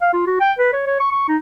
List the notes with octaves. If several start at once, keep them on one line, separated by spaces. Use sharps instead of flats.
F5
F4
F#4
G5
B4
C#5
C#5
C#6
C#6
D#4